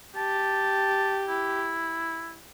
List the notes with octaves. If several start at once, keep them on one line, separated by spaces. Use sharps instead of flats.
G4 A5
E4